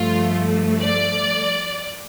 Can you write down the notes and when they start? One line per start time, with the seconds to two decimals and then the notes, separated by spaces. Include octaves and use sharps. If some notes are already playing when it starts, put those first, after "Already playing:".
Already playing: G2 F3 A3 F4
0.80 D5